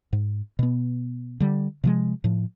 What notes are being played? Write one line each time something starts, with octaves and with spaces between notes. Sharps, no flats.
G#2
B2 B3
D3 G3
C3 F3 G#3
A2 F3